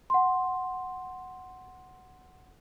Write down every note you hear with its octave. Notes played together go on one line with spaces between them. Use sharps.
F#5 C6